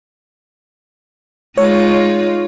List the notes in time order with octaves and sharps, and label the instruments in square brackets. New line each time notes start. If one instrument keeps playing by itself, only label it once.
[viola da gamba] G#3 D#4 F4 [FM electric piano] C#5